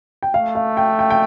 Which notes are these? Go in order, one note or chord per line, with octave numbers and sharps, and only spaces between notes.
G5
A3 F5
F5
G5
G5
G5